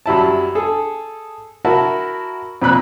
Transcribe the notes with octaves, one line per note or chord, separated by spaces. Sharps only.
F#2 G3 E4 A5
G#4 A4
E4 F#4 A#4 A5
F2 A#2 B5 F#6